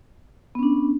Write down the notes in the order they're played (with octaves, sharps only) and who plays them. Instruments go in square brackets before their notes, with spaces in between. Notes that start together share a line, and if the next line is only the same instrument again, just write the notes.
[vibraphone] B3
C#4
D4